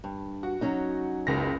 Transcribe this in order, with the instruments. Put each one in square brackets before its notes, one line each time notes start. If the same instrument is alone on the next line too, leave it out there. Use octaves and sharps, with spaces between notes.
[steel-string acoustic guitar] G2
[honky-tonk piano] F#4
[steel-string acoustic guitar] F#3 C#4 D#4
[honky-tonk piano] F#1 C#2 A#6